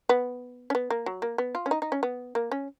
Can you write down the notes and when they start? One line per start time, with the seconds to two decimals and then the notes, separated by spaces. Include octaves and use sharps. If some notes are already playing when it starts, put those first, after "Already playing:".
0.09 B3
0.70 C#4
0.75 B3
0.90 A#3
1.06 F#3
1.22 A#3
1.38 B3
1.55 F4
1.66 C#4
1.71 D#4
1.82 D#4
1.92 C#4
2.03 B3
2.35 A#3
2.52 C#4